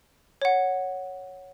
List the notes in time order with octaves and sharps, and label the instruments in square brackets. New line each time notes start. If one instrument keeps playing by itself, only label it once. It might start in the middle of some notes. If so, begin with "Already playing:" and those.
[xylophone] C#5 F#5